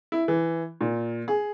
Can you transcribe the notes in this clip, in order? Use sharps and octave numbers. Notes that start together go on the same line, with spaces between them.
E4
E3
A#2
G#4